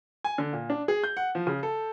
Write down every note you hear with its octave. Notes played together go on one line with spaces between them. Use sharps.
G#5
D3
A#2
D4
G#4
G6
F#5
F3
C#3
A4